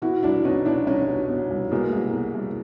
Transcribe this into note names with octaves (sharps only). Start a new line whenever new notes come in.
B2 E4 F#4
C2 D4 E4
B2 C#4 D#4
B2 D4 E4
C2 C#4 D#4
B2
B2
C2
B2 G#3 A#3
C2
B2
C2